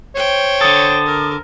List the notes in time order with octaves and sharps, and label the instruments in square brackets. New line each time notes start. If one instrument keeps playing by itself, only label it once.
[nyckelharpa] C5 G5 [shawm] C#5
[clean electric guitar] D3 A4 [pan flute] D#6
[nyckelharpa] A#4